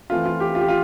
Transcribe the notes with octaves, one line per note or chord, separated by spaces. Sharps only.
E3 A3 C4 F4
F4
G4
F4
G4
F4